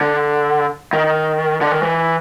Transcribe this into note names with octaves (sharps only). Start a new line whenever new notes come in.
D3
D#3
D3
D#3
E3